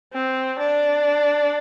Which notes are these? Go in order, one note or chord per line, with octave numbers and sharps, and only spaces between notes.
C4
D4